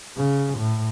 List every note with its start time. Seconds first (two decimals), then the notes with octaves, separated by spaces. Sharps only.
0.16 C#3
0.58 A2